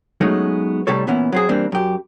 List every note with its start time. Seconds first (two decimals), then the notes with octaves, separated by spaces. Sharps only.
0.21 F#3 G#3 A3 B3 C#4 D#4
0.87 A2 C3 G3 A4 C#5
1.07 A#2 E3 B3 C#4 E4
1.32 F#3 C4 G#4
1.49 E3 G3 A#3 C4 D4
1.72 F#2 G4